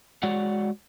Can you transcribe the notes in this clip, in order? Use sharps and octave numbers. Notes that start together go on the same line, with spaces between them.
G#3 F#4 C#5 D5 F#5